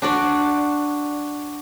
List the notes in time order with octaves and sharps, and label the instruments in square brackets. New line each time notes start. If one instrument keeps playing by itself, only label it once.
[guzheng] D4 F#4 D5